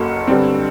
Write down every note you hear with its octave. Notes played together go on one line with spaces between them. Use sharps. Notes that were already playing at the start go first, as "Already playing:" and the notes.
Already playing: F#1 F#2 F#3 A#3 A4
G2 D3 G3 C4